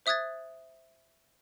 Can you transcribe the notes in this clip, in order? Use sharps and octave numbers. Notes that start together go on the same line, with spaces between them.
C5 E5 D#6 F#6 G#6 A6